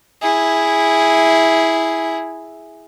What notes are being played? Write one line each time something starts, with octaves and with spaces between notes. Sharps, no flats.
E4 G#4